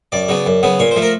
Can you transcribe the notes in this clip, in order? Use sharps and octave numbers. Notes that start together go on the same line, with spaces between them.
F#2 D5
C#3 F#3 B3
F#2
C#3 F#3 B3
A#2 C#5
C5
F3 A3
A#4